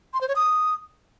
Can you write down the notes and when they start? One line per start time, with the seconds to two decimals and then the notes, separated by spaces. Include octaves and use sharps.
0.14 C6
0.21 C5
0.28 C#5
0.36 D#6